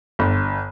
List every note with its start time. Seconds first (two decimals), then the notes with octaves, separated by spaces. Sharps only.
0.19 G1